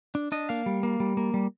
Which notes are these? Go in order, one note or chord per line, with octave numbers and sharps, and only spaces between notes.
D4
D4 D#5
A#3 F5
G3
A#3
G3
A#3
G3